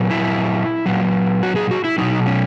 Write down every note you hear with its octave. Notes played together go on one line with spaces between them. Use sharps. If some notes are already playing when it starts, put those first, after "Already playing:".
Already playing: A#2 F#3
E4
A#2 F#3
F#4
G#4
F#4
E4
B2 F#3 D#4
C#4